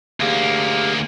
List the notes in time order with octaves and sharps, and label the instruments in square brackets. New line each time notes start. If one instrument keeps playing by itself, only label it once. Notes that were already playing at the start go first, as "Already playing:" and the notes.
[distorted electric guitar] D2 A#3 [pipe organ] G4 G#4 F5